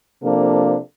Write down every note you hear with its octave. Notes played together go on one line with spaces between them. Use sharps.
C3 F3 A#3 D4 A4